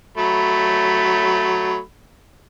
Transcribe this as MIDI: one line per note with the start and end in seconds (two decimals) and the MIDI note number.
0.18 1.79 54
0.18 1.79 57
0.18 1.79 83